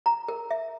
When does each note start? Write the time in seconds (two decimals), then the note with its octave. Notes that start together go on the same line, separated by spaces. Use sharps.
0.06 A#5
0.28 A#4
0.51 E5